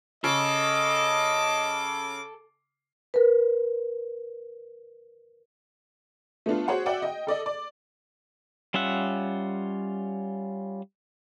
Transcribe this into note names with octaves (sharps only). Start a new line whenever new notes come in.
C#3 A4 D#5 D6
A#4 B4
A3 B3 D4 F4
F#4 G#4 C5 C#5 F#5
F#4 D5 E5 F#5 G5
D#5 G5
A4 D5 D#5
D5
G3 C#4 F4 E5 F#5